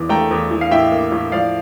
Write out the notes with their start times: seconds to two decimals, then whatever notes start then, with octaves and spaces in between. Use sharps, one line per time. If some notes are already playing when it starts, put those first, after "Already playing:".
Already playing: E2 E3
0.09 A3 G5 A#5
0.31 E2
0.50 E3
0.61 F5
0.71 A2 E5 G5
0.92 A#3
1.12 A2
1.32 F3 D5 F5